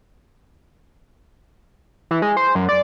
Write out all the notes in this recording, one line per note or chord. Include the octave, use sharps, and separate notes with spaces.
E3
G#3
C5
F#2
D5